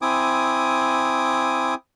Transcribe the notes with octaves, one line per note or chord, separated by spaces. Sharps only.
C4 E4 G#5 D6 D#6